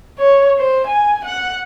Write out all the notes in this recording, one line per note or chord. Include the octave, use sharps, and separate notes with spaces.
C#5
C5
G#5
F#5